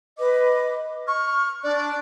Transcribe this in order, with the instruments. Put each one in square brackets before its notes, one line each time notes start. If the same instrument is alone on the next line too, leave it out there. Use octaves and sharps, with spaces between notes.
[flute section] B4 D#5 D6
[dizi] C#6 [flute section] F6
[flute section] D4 F#6 [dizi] D5